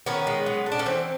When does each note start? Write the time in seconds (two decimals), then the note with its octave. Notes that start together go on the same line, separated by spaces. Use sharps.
0.06 D#3 B3 C#4
0.27 G#3
0.46 F#3
0.66 A3
0.72 D4
0.79 C#4
0.86 E3 C4